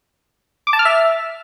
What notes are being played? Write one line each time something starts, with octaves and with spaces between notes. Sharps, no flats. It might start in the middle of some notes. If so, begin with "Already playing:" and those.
D6
A5
F6
E5